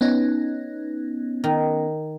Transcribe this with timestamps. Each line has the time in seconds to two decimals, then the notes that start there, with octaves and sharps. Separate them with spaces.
0.01 B3 C#4 D#4
1.44 D#3